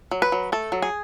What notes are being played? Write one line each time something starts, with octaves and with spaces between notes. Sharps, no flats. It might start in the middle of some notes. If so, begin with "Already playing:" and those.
F#3
B4
F#3
A3 A4
F#3
G#4